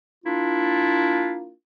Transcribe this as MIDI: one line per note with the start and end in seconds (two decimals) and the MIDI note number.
0.24 1.51 58
0.24 1.51 62
0.24 1.51 64
0.24 1.51 65